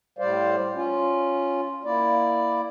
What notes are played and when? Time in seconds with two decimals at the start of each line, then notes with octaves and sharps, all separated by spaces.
0.19 A2 G3 C5 D5 F5
0.74 C#4 F4
1.84 A#3 E4 D5